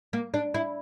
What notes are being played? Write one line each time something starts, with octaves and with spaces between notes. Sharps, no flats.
A#3
D4
E4